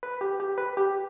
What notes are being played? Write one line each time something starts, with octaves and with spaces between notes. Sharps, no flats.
B4
G4
G4
B4
G4